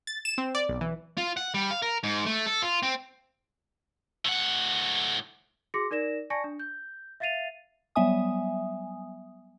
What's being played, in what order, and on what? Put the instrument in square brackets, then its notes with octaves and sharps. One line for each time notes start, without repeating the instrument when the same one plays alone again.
[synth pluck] A6
E7
C4
D5
B1
E3
[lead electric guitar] F4
F#5
G3
F5
A#4
G#2
A3
A4
F4
C4
[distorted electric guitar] A2 F#5
[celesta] F#4 G#4 C6 D6 A#6 C#7
D#4 A#4 D5 A#6 E7
D5 G#5 A5 C#6 A#6 C#7
D4
G6
E5 F5 A6 C7 D#7 F7
[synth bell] F#3 G3 B3 E5 G#5 D#6